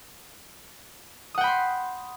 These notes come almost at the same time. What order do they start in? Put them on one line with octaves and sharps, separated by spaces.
D#6 F#5 G5 B5 C6